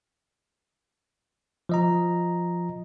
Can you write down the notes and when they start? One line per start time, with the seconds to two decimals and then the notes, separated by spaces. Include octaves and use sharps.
1.69 F3 D#5 A#5